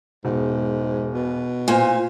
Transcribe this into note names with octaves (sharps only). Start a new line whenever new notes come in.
E1 G#2
B2
A#2 C5 G#5